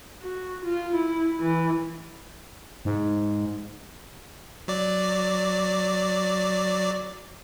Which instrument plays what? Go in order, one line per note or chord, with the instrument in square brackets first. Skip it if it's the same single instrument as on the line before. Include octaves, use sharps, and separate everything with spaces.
[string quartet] F#4
F4
E4
E3
[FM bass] G#2
[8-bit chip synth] F#3 D5